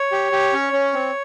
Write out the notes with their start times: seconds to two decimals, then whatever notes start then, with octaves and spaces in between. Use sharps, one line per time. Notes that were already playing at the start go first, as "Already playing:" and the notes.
Already playing: C#5
0.12 G4
0.32 G4
0.53 C#4
0.73 C#4
0.93 C4